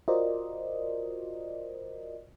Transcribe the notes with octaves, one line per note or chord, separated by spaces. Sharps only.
F4 F#4 A#4 C5 D5 D#5